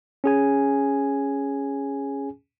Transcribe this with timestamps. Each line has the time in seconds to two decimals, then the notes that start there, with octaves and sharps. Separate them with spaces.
0.24 C#4 G#4 G#5